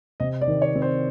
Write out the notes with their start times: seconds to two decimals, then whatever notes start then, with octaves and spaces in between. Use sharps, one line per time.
0.20 C3 D#5
0.41 D5
0.48 D#3
0.62 C#5
0.75 C4
0.82 C5